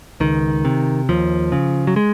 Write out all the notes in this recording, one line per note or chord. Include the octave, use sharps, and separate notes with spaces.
C#2 D#3
C3
D#2 F3
C#3
F#3
G#3